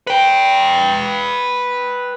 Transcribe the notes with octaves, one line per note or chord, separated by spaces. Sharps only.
B4 G5